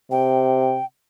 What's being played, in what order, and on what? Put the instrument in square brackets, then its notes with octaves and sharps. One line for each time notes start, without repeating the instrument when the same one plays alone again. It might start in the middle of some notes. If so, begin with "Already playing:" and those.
[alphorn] C3 [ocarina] G5